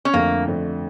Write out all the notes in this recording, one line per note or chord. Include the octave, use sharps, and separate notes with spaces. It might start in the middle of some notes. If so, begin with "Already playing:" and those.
C#4
F2 D3 A3 A#3
F2 D3 A3